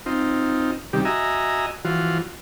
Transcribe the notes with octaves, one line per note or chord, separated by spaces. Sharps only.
C4 D#4 F4
C3 D#3 G3 G4
F#4 D#5 E5 G#5 A#5
E3 F3 F4 F#4